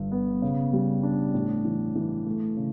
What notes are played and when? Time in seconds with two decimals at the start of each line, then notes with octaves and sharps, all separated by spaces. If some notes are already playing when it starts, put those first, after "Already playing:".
Already playing: G1 G2
0.12 B3
0.42 C#3
0.73 G3
1.03 D4
1.34 A2
1.65 E3
1.96 E3
2.26 A3
2.57 C#3